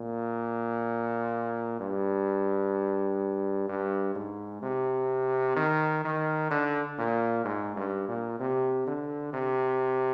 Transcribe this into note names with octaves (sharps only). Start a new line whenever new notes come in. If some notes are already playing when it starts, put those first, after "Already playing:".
Already playing: A#2
G2
G2
G#2
C3
D#3
D#3
D3
A#2
G#2
G2
A#2
C3
D3
C3